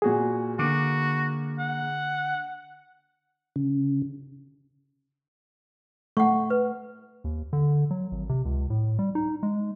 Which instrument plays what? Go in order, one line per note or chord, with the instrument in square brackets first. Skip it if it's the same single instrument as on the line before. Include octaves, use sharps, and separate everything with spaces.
[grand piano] A#2 F#4 G#5 [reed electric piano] G#4
[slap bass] D3 [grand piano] A#3 D6 [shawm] F#4
[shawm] F#5
[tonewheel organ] C#3
[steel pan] A3 [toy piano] F#5 C#6
[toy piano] B4
[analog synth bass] D#2
D3
F#3
G#1
C3
C#2
A2
G3
D#4
G#3